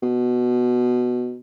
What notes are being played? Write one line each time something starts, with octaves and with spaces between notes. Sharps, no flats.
B2